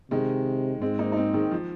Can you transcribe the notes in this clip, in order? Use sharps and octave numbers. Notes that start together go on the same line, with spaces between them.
C3 D#3 G#3
G#2 G#3 C4
A#3 D#4
D#4
G#3 C4
D#3 G#3
F3